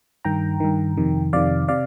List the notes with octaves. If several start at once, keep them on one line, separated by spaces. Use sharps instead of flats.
G2 D#3 G5 A#5
G2 D#3
F2 C3 D#3
F2 C3 D#3 D5 F5
C3 D5 F5